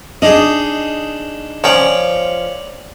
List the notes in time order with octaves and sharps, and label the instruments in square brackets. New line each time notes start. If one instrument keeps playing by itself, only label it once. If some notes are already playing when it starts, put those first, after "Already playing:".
[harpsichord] D4 D#4 G#4 [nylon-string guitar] D#5
[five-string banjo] F3 C#4 [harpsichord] C#5 D5 G5